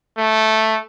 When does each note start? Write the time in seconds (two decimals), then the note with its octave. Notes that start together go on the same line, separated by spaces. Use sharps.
0.18 A3